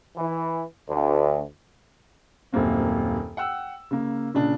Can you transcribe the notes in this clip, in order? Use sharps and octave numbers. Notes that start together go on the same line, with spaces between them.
E3
D2
D#1 F#2 A#3 C4
F#5 G5 E6
C#3 A#3
A#2 C#3 D4